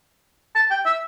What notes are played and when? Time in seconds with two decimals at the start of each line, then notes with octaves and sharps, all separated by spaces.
0.56 A5
0.71 G5
0.86 E5